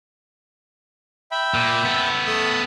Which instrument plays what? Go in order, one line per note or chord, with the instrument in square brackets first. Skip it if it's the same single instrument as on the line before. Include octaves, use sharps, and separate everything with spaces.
[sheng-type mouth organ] E5 G5 B5
[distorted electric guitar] A#2
B3 A4
[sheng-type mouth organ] A3 D#6 E6